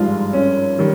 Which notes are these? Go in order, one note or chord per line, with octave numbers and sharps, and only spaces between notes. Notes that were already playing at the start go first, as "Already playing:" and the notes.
Already playing: G#1 G2 F3 G#3 F4
C#4
D#3 G3